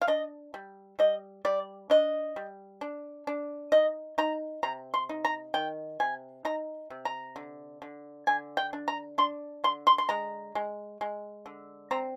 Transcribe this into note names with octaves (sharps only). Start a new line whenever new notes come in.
F5
D4 D#5
G3
G3 D#5
G3 D5
D4 D#5
G3
D4
D4
D#4 D#5
D#4 A#5
C3 A#5
C6
D#4
A#5
D#3 G5
C3 G#5
D#4 A#5
C3
A#5
D3
D3
D3 G#5
G5
D4
A#5
D4 C6
D3 C6
C6
C6
G#3 A#5
G#3
G#3
D3
C4 A#5